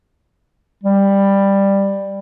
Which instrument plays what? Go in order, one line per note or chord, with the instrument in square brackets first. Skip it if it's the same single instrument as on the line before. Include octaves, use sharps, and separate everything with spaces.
[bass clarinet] G3